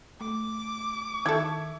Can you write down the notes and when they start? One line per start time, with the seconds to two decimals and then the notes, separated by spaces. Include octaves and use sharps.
0.21 A3 D6
1.26 D#3 E4 A4 E5 G#6